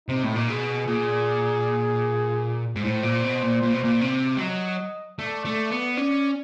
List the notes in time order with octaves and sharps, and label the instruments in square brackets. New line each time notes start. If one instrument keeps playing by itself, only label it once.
[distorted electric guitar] C3 [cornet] D#4
[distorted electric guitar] A2
A#2
[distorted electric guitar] B2 [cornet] G#4
[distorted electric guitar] A#2 [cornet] G#4
[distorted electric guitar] G#2
[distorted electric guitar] A2 [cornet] C5
[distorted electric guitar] A#2
B2
A#2
A#2
B2
A#2
C3
G3
[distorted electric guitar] F#3 [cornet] D#5
[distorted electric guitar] A3 [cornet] D5
[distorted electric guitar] A3
B3
[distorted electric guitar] C#4 [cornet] D5